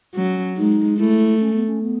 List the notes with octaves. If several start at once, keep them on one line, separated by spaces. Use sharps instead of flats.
F#3 C#4
G#3 D#4
A3 E4
C#4
B3
C#4
B3